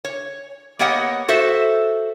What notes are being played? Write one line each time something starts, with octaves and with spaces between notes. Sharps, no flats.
C#5
A#3 B3 G4 C#5 D#5 F#5
F#4 A4 C5 E5